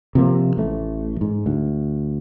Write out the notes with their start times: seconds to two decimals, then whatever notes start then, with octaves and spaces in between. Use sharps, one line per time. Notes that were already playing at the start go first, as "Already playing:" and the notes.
0.15 C3 F3 A#3
0.57 A1 A3
1.21 G#2
1.46 D2